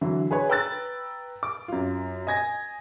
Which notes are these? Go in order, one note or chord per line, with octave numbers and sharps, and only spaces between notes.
D3 E3 F#3
G#4 B4 C#5
B4 G5 A#5 E6 F#6 A6
D6
F#2 F4
D#5 G#5 G#6 A#6